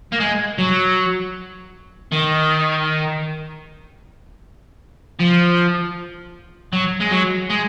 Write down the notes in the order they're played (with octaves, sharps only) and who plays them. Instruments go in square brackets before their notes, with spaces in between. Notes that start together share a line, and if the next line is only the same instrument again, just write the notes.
[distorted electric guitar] A#3
G#3
F#3
D#3
F3
F#3
G#3
F#3
G#3